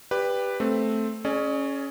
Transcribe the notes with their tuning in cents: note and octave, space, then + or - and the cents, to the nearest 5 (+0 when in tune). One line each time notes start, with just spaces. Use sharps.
G4 +15 B4 +0 D5 -10
A3 +0 C4 +0
C#4 +0 G#4 +25 D5 +40